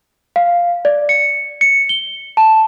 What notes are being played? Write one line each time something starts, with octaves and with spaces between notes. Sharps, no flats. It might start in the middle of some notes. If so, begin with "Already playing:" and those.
F5
D5
C#7
C#7
G7
A5